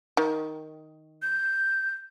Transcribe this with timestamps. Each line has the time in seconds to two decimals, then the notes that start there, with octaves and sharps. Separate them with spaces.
0.17 D#3
1.22 G6